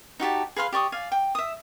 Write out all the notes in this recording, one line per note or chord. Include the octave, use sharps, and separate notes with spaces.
D#4 F#4 G4 A5
G#4 B4 F5 C6
G4 D5 C#6 D#6
D5 F5 G#5
G5
E5 D#6